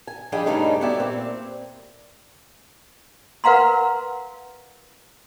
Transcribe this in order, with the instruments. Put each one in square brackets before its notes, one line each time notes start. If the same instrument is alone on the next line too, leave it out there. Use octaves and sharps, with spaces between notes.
[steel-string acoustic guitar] G#5
F3 G3 D4 G#4 D#5 G5
G2 C#3 G3 A3 D4 D#4
B3 F#4 G4 D5 E5 G#5
A#2 C4
[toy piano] A#4 B4 F5 F#5 A#5 C6